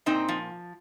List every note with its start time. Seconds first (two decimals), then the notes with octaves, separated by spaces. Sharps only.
0.06 A#2 C4 D#4
0.28 F3